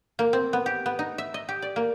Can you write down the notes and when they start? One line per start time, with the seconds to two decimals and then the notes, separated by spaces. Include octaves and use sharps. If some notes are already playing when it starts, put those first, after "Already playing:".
0.19 A#3
0.33 C4
0.53 B3
0.66 G4
0.86 B3
0.99 D#4
1.18 E5
1.34 D#5
1.49 G4
1.62 D5
1.76 A#3